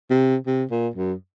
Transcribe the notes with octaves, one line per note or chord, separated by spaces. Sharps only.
C3
C3
A#2
F#2